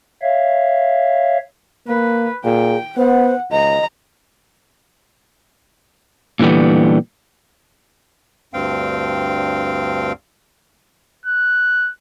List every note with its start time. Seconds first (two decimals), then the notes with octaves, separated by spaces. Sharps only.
0.22 C#5 E5 F5
1.87 A#3 B4
2.45 A#2 G#4 G5
2.97 B3 C5 F#5
3.51 C#2 D#5 A#5
6.40 A#2 D3 E3 G3 B3
8.54 D2 G2 C4 F5 G5
11.26 F#6